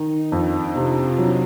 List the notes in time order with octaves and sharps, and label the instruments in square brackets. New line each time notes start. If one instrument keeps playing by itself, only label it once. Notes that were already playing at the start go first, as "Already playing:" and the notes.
Already playing: [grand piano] D#3 [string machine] D#4
[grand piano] F2 [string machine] D4
[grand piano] C3 [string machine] F4
[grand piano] F#3